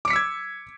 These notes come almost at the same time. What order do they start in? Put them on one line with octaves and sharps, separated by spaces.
D6 C#7 B6 E6 G#6